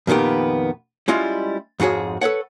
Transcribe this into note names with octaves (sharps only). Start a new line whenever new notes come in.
F2 A#2 D#3 B3 G4
G3 G#3 C#4 E4 F4 D#5
F2 G#2 F#4 G#4 C#5
A4 B4 C#5 F#5